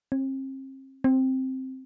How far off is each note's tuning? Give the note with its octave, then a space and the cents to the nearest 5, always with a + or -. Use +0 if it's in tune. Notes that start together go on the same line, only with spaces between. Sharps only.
C4 +40
C4 +5